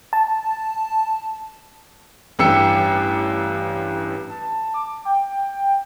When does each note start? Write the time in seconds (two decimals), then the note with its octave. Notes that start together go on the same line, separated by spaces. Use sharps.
0.13 A5
2.39 A1 G2 G4 E6 C#7
4.30 A5
4.74 D6
5.05 G5